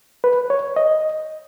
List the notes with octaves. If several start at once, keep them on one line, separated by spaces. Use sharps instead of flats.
B4
C#5
D#5